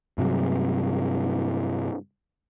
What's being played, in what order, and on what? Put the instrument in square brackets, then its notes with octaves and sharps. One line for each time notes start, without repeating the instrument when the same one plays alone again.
[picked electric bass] G2 C3 F#3